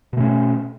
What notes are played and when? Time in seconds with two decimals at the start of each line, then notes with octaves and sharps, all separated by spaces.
0.13 B2
0.17 A3
0.20 C#4